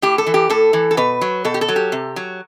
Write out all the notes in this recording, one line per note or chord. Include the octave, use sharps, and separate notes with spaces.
A2 G4
A4
E3
G4
A2 A4
E3
A4
B2 B4
F#3
B2 A4
G4
A4
F#3
G4
C3
F#3